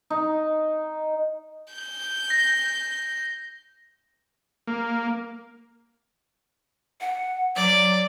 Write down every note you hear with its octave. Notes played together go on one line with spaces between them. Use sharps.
D#4
G6
A#6
A#3
F#5
F#3 D5